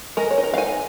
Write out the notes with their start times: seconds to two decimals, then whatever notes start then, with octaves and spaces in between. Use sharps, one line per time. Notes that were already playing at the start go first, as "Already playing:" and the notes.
0.17 G#3 A#4
0.31 C#5
0.38 D#4
0.44 A#4
0.54 F5
0.58 D#4 G#5